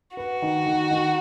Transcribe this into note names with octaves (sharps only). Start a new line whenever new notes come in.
F#4 B4
D#3
D#3
D#3